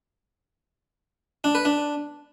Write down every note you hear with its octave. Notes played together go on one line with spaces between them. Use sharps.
D4
B4
D4